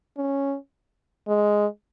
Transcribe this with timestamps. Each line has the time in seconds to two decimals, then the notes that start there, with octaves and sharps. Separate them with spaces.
0.17 C#4
1.28 G#3